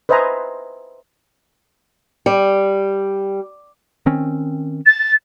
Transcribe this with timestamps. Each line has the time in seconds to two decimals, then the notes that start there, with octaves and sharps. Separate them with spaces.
0.09 B4 C5 D#5 E5 G#5 A#5
2.26 G3
4.06 D#3 C4 C#4
4.86 A6